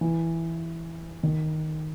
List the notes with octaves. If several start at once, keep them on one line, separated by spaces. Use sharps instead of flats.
E3
D#3